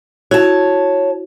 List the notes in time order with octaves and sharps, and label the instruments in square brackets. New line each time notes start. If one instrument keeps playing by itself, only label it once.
[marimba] E4 F#4 [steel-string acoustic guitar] C#5 A5